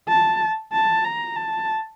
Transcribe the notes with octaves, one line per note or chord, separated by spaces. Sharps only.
A5
A5
A#5
A5